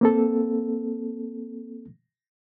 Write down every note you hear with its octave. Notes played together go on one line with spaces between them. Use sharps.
A#3 C4 A4